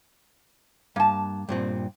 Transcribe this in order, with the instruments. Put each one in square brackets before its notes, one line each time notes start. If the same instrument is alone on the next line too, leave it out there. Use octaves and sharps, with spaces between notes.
[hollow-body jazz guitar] G2 [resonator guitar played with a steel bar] A#3 A5
[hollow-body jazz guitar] G2 A#2 C4